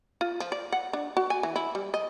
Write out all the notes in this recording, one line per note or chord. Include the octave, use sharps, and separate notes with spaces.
F4
F3
D5
F#5
D4
F#4
G#5
E3
E4
G3
D#5